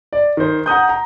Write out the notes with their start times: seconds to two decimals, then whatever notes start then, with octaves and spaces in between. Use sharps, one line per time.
0.13 D5
0.37 D#3 C5
0.66 F#5 A#5 D#6 G6
0.89 A#5